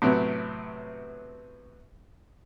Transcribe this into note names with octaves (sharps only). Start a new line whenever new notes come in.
A2 C3 F#3 B3